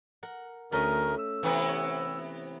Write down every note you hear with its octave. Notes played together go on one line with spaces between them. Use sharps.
A#4 F#5
D2 A3 C#4 A#4 D#5
E6
C3 E3 B3 E4
C#5